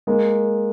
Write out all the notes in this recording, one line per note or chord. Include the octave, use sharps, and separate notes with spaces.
G#3 A#3